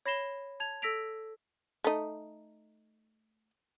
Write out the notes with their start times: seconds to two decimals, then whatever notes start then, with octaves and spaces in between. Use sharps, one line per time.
0.06 C#5 B5 A#6 C7 E7 G7
0.60 A5 G#6 F7
0.82 A4 E6 A#6 B6 D7 F7
1.84 A3 D#4